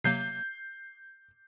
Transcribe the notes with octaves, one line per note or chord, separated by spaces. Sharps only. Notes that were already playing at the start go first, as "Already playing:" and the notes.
C3 F#3 A#3 G6 C7